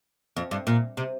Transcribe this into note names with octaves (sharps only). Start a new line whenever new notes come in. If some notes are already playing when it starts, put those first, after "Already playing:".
F2
G2
A#2
C3